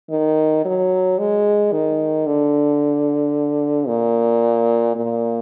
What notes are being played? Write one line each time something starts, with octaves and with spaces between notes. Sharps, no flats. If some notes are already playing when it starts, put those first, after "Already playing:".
D#3
F#3
G#3
D#3
D3
A#2
A#2